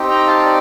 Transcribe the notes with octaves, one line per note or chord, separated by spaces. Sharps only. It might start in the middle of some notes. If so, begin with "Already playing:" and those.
Already playing: C4 D#4 G4
G5 A#5
F5 A5
D5